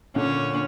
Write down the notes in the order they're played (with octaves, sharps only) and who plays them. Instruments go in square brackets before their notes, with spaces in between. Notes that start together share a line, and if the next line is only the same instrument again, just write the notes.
[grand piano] A#2 D3 [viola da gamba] C#4